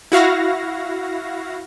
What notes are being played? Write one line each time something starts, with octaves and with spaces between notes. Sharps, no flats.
E4 F#4 F5 A#6